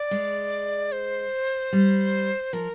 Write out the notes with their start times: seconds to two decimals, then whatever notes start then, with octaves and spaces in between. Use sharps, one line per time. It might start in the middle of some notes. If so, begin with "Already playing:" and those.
Already playing: D5
0.11 G#3
0.92 C5
1.73 G3
2.53 F3 A#4